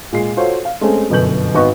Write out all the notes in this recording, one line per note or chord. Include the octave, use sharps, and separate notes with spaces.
A#2 G#3 C7
F4 F#4 A4 C5 C#5
F5
G#3 A3 C4 C#4
G1 F#2 B2 A4 G6 F#7
G#1 B3 F#4 B4 D#5 C#6